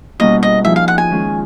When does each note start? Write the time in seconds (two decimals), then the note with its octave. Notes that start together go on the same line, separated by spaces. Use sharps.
0.19 B2 G3 A#3 C#4 E4 D#5
0.43 D#5
0.64 F3 A#3 D#4 G#4 E5
0.76 F5
0.88 F#5
0.98 G#5
1.10 D#3 G#3 C#4 F4 G#4